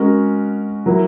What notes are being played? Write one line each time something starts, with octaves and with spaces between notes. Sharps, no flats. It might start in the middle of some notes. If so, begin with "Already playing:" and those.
Already playing: G#3 C#4 F#4 A#4
F#3 A#3 E4